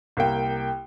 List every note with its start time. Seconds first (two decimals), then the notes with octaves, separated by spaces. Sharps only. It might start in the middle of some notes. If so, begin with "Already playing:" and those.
0.17 C2 A#3 G5